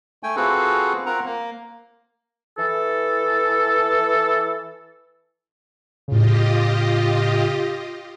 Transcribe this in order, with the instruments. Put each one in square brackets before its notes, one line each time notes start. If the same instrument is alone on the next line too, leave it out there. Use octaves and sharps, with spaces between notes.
[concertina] A3 G5 G#5
C4 F4 F#4 G#4 A4 B4
C4 F4 A#4 F#5 A#5
A#3
[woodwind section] E3 A4
[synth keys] A2 C#3 [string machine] F4 G4 D#5